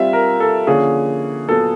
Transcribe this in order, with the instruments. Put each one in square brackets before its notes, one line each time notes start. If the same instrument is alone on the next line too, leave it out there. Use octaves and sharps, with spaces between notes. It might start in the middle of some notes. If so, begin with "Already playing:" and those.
Already playing: [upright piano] G3 C4 F4 [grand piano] E5 F5
[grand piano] A#4
A4
[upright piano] D3 F3 A#3 C#4 [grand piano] G#4
[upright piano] A#2 F#3 B3 [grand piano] A4